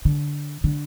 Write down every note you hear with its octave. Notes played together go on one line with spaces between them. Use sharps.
D3
D3